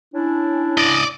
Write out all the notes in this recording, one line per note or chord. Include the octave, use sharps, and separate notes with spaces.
C#4 D4 E4
D5 D#5